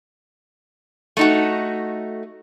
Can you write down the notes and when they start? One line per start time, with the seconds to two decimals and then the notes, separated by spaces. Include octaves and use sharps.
1.17 A3 D#4 F#4